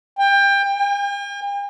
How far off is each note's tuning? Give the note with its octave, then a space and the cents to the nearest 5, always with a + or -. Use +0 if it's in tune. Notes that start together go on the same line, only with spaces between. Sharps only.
G5 +25
G5 +45